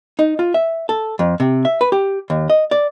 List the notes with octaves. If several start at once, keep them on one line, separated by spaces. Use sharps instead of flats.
D#4
F4
E5
A4
F2
C3
E5
B4
G4
D#2
D#5
D5